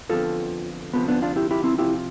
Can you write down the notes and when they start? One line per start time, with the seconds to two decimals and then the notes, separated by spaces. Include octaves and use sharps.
0.09 F2 D3 F3 B3 F4 A4
0.93 D2 C3 F3 B3
1.08 B3 D4
1.22 D4 F4
1.36 E4 G4
1.51 E4 G4
1.64 C4 E4
1.78 C3 F3 C4 E4 F4 G4